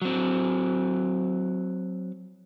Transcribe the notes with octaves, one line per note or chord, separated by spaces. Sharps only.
F#3 C4